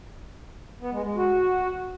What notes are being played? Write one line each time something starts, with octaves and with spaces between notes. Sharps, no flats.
B3
G#3
G#3
F#4